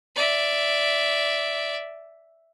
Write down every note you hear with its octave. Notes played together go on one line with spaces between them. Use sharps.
D5 E5